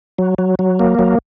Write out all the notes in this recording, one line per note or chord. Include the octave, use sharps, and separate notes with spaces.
F#3
F#3
F#3
A#3
F#3